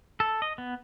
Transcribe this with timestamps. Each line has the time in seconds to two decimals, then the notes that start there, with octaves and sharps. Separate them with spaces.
0.20 A4
0.42 D#5
0.58 B3